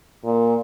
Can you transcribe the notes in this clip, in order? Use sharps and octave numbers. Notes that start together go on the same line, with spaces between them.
A#2